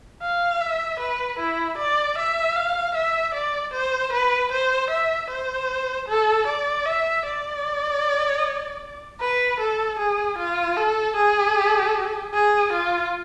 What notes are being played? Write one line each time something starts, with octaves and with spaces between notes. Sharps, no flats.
F5
E5
B4
E4
D5
E5
F5
E5
D5
C5
B4
C5
E5
C5
A4
D5
E5
D5
B4
A4
G#4
F4
A4
G#4
G#4
F4